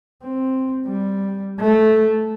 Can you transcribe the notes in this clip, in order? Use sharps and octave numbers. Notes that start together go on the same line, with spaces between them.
C4
G3
A3